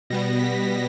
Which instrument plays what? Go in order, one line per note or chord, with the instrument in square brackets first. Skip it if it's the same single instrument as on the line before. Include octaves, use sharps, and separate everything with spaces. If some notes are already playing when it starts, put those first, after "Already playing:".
[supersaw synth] B2 G3 B3 A#6
B6